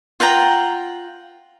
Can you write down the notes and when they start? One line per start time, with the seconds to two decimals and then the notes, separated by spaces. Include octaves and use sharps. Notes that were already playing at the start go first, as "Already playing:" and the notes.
0.20 F4 F#5 G5 A#5